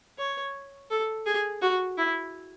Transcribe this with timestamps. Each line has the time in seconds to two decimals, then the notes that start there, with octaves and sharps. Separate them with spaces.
0.18 C#5
0.90 A4
1.26 G#4
1.62 F#4
1.97 E4